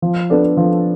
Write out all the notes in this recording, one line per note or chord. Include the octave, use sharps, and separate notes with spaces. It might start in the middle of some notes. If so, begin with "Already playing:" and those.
F3
B3 D4 A4 D5
F3